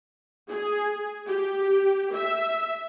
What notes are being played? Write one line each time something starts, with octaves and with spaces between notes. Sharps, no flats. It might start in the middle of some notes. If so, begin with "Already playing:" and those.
G#4
G4
E5